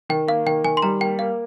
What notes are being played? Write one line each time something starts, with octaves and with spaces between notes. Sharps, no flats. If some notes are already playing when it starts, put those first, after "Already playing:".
D#3 G5
A#3 F5
D#3 G5
D#3 G#5
C6
G3 A#5
A#3 G5
A#3 F5